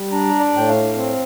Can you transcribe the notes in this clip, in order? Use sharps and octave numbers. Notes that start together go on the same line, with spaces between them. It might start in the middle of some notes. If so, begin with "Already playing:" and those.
Already playing: G3
D4 A#5
D5
A2 G5
F5
C4